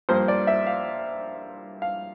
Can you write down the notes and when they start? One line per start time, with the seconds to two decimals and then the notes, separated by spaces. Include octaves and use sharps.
0.09 G2 F3 A#3 C5
0.28 D5
0.47 E5
0.67 F5
1.82 F5